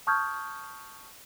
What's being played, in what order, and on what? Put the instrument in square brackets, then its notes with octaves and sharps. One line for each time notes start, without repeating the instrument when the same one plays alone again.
[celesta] A5 C#6 D#6 F6 G6 G#6